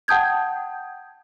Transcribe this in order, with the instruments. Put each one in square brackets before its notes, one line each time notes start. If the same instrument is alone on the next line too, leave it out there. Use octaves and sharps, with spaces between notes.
[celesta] F#5 G5 A5 D#6 G6 G#6